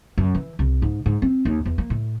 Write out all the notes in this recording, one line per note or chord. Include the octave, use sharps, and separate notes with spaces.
F#2
E3
C2
G#2
G#2
C4
D#2
E2
A#3
A2